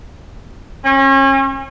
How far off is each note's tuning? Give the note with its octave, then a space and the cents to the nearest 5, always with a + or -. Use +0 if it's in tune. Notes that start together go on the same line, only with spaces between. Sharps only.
C#4 -35